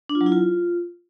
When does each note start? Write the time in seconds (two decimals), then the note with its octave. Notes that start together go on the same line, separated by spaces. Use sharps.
0.09 D4
0.15 F4
0.21 F#3
0.26 E4
0.32 F4